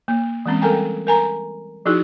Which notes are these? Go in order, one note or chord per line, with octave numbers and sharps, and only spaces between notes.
A#3
E3 G#3 C4 C#4
G3 A4 A#4 G5 G#5 A#5
A#4 G#5 A#5
F3 D#4 E4 F#4 G#4